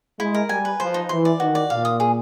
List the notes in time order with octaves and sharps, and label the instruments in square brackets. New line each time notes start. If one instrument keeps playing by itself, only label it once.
[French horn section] G#3 [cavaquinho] E4
[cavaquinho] A#4
[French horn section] G3 [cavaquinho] G#5
[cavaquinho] B4
[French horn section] F3 [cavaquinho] C5
[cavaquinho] D#4
[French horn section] E3 [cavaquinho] C6
[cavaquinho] D5
[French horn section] D#3 [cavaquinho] F#4
[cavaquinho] D5
[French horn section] A#2 [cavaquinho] F5
[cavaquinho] D#6
G#4